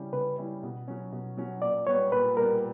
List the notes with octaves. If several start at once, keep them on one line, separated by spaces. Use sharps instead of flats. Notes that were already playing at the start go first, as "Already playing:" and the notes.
Already playing: C#3 G3 C#4 E4
C#3 B4
G3 C#4 E4
B2
F#3 C#4
B2
F#3 C#4
A#2 D5
G3 B3 C#5
A#2 B4
G3 B3 A#4